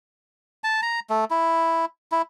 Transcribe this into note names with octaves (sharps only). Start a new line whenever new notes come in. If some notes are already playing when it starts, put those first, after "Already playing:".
A5
A#5
A3
E4
E4